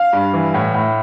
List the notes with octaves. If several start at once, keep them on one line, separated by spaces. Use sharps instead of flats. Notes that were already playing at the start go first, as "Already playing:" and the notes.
Already playing: F5
G2
E3
A2
A2